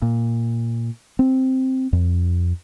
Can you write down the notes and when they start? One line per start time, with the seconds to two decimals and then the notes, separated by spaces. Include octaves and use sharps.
0.02 A#2
1.19 C4
1.93 F2